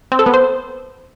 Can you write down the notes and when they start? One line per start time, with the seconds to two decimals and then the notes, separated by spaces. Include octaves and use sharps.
0.12 C4
0.19 A4
0.26 B3
0.34 C5